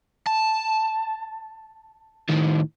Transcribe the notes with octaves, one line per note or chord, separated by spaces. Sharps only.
A5
A2 D#3